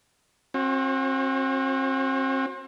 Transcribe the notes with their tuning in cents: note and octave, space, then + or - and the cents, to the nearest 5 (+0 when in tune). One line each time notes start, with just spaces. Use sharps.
C4 +35 F#4 -20